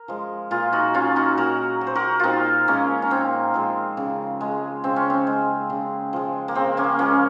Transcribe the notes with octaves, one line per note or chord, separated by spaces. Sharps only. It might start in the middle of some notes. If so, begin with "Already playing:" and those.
Already playing: A#4
F3 G#3
A#2 F4 G#4
D#4 F#4
F#3 C#4 F4
D#4 F#4
A#2 F#4 A#4
F#3
C5
F#4 A#4
A#2 C4 D#4 F4
F3 G#3 A#3 C#4
C#4
A#2 C4
F3 G#3
C#3
G#3
C#3 C4
C#4
C4
G#3
C#3
F3 G#3
A#3
C#3 C4
A#3 C#4
F3 G#3 A#3 C#4